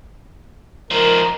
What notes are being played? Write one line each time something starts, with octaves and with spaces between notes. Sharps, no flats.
F3 D#4 A#4